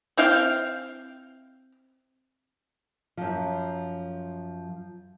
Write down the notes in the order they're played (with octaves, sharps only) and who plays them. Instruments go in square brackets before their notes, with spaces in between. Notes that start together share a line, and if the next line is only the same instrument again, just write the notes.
[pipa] C4 E4 F5 G5
[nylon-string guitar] F#2 F3